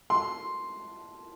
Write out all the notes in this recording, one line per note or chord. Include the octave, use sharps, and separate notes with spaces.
C6